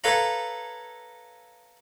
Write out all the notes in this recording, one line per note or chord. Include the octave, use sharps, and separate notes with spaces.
A4 B4 C#5 F5 A#5